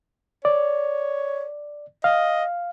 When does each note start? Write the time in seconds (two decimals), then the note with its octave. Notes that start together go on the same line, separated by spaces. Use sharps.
0.45 C#5 D5
2.04 D#5 F5